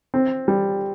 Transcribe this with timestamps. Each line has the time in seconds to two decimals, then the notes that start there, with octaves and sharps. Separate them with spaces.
0.14 C4
0.48 G3